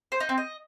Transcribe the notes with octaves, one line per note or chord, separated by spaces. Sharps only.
C5
D#4
C4
D#5